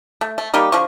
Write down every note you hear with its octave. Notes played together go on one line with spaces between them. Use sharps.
A3
A3
G3 A#3 D#4 G4
D3 F3 F4 C#6